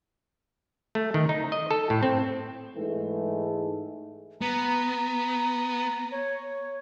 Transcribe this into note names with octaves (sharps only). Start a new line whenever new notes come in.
A3
D#3
D#4
D#5
A4
A2
C4
G#2 E3 G#3 A3
B3 A#5
C#5